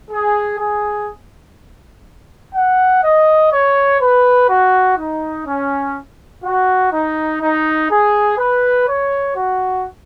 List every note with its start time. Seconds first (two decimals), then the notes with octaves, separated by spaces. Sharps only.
0.11 G#4
0.60 G#4
2.55 F#5
3.04 D#5
3.52 C#5
4.01 B4
4.49 F#4
4.98 D#4
5.47 C#4
6.44 F#4
6.93 D#4
7.41 D#4
7.90 G#4
8.38 B4
8.88 C#5
9.36 F#4